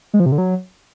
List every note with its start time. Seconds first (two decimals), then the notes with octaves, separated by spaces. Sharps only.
0.14 G#3
0.20 F3
0.26 C3
0.32 D3
0.38 F#3